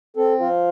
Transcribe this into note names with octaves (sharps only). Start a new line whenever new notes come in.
C4 A4
F3 F4